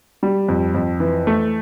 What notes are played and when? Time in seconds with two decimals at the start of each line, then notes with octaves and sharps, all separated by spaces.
0.23 G3
0.48 F2
0.74 F2
1.00 E3
1.27 A3